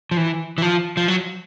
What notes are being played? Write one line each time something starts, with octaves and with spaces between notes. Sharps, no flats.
F3
E3
E3
F3
F3
F#3